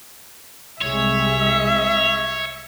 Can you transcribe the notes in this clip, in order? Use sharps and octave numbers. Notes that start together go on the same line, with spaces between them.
C2 C3 G#3 C#5 E5